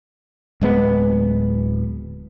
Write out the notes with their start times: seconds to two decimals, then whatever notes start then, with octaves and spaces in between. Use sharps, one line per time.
0.61 D1 G#3 B3